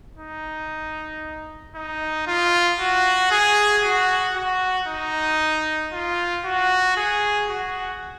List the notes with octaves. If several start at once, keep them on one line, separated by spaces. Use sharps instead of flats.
D#4
D#4
F4
F#4
G#4
F#4
F#4
D#4
F4
F#4
G#4
F#4